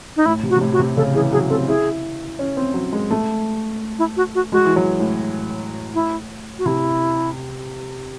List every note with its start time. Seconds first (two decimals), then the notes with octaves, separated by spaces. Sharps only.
0.17 D#4
0.26 A2 E4
0.43 C3
0.50 F#4
0.56 C3
0.61 A2
0.73 F#4
0.79 C3
0.96 C#3 A4
1.15 E3 G#4
1.33 F#3 G#4
1.50 C4 A4
1.68 E4 G#4
2.39 C#4
2.57 C4
2.74 F#3
2.93 G#3
3.11 A3
3.99 E4
4.17 F#4
4.35 F#4
4.52 G#3 F#4
4.65 E3
4.76 F#3
5.00 A2
5.95 E4
6.59 F#4
6.66 C3 E4